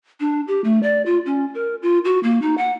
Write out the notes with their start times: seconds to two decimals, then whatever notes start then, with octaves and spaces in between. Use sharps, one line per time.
0.20 D4
0.47 G4
0.64 A3
0.83 D5
1.06 F4
1.26 C#4
1.54 A#4
1.82 F4
2.05 F#4
2.23 A#3
2.42 D#4
2.57 F#5